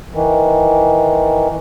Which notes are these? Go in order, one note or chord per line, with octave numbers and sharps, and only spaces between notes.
D#3 E3